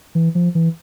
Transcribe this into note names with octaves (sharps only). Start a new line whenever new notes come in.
E3
F3
E3